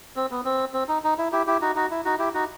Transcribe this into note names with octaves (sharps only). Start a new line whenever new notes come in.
C4
B3
C4
C4
D#4
D#4
E4
E4 G4
E4 G4
D#4 F#4
D#4 F#4
E4
D#4 F#4
E4 G4
D#4 F#4